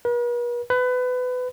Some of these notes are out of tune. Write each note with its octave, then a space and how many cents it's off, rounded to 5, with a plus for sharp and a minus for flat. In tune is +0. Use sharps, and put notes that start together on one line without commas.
B4 -45
B4 +25